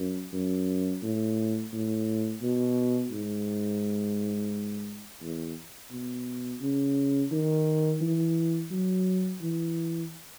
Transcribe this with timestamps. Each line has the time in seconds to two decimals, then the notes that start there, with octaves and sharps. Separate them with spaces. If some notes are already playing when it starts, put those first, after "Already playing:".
Already playing: F#2
0.33 F#2
1.03 A2
1.73 A2
2.42 B2
3.12 G#2
5.22 E2
5.92 B2
6.61 C#3
7.32 D#3
8.01 E3
8.71 F#3
9.42 E3